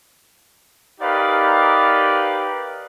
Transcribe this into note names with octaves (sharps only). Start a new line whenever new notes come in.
D#4 G4 A#4 B4 D5 F5